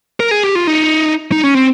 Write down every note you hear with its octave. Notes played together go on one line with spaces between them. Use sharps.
A#4
G#4
G4
F4
D#4
D#4
C#4
C4